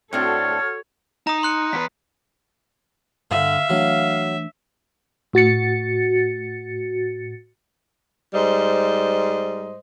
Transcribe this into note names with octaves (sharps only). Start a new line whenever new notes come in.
A2 C4 D4 F#4 A4 C#5 F6
D#4 A#5 D#6
C6 F#6 C#7
E2 B4 B6
G2 D3 E5 F5
E3 F#3 A3 D4
A2 F#4 A6 C#7
G#2 G3 C5 D#5